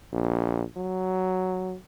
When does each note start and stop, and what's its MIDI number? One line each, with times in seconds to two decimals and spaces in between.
0.13 0.63 34
0.77 1.75 54